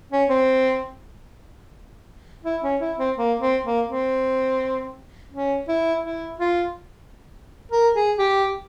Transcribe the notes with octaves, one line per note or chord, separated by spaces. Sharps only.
C#4
C4
E4
C#4
E4
C4
A#3
C4
A#3
C4
C#4
E4
E4
F4
A#4
G#4
G4